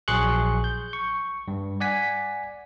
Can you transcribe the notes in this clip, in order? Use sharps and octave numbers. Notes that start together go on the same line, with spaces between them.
A#1 F#3 G#4 C6 C#6 F#6
G6
C#6
G2
D5 F#5 G#5 B6